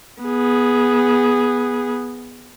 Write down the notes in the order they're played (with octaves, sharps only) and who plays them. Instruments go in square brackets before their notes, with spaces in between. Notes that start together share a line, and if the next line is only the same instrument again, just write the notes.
[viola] B3 G#4